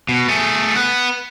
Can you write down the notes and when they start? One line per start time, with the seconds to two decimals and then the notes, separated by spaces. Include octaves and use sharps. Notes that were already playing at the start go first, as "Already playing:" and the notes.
0.09 B2
0.28 A3 G#4
0.76 B4 F#5